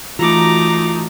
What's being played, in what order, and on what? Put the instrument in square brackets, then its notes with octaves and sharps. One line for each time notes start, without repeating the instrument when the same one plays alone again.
[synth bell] E3 F#4 A#6 [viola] A3 D#4 [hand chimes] F4 [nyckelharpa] A#5 D6